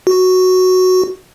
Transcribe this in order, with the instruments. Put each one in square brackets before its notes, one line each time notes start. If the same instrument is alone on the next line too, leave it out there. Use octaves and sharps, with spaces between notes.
[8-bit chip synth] F#4